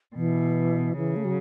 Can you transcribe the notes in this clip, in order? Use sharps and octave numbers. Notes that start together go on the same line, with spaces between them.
B2 E3
C#3 E3
A3
F#3